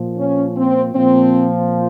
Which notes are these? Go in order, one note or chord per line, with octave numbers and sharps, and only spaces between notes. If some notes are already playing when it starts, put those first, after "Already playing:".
Already playing: A#2 F3
C#4
C4
A#2 F3 C4